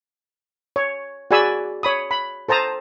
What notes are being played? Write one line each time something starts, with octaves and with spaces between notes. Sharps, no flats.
C#5
F#4 G#4 D5 G#5 B5 E6
C#5 B5 D#6
B5
A4 C5 A5 A#5 D#6